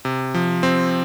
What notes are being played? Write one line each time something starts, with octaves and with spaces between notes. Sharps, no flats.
C3
F3
C4